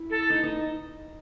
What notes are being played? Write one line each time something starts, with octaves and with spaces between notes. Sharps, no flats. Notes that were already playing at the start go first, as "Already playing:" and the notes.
Already playing: E4
A4
D#4
D#4